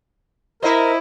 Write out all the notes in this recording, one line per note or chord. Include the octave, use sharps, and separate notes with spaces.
E4 A#4 C5 D#5 E5